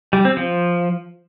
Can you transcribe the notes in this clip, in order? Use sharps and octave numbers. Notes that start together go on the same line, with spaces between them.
G3
C4
F3